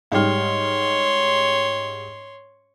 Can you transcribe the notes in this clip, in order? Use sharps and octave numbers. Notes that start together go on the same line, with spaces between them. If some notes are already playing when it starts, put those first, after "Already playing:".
G#2 G3 C#5 C6 F6